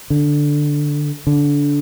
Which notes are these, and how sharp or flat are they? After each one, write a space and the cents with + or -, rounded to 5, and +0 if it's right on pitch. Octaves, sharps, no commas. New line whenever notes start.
D3 +0
D3 -20